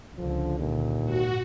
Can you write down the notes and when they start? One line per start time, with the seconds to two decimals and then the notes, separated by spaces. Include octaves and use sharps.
0.18 C#2 D3 F3
0.59 D#2 A#2
1.05 G#2 F#4